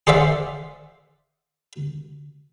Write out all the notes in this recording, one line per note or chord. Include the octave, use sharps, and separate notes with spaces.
G#4 C5 D5 E5 F5